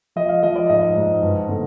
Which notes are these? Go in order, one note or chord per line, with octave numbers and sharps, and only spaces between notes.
F3 D#5
F5
F3 D#5
D5
G#2 D#5
G#2
G2
D3